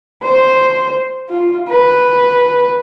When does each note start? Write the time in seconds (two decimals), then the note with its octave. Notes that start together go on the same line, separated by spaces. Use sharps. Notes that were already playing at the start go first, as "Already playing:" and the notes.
0.23 C5
1.29 F4
1.70 B4